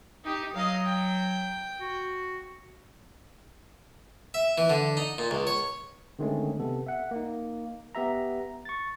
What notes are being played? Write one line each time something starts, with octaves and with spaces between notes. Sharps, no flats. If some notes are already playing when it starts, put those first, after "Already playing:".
D#4 G4
F#3 D#5 F5
G5
F#4
E5
E3
D3
D#4
A#2
C#2
C#5
D3 D#3 G#3 A3 C4 C#4
C3 B3 A4
E5 F#5
A#3 D#4
B3 G4 E5 A#5
C#6 A6